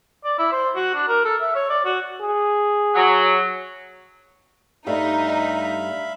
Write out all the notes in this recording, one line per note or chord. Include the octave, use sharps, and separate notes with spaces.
D5
E4
C5
F#4
D4
A#4
A4
E5
C#5
D5
F#4
G#4
F#3
G2 G3 A3 D#4 E5 F5 B5